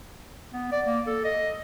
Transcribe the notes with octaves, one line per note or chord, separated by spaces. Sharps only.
B3
D5
A#3
A4
D#5